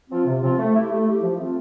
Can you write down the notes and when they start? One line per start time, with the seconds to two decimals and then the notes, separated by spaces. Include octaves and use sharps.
0.10 F3 C4 F4
0.26 C3
0.42 F3 C4 F4
0.58 A3
0.74 E4 G4
0.90 A3
1.06 E4 G4
1.22 F3
1.37 A3 C4 F4